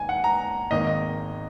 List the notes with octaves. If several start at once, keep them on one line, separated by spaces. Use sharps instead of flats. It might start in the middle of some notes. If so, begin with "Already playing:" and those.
Already playing: D#2 D#3 G#5
F#5
A#5
G#1 G#2 D#3 A#3 D#5